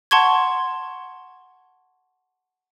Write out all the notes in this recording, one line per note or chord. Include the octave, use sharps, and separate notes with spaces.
F#5 A5 C6 C#6 G#6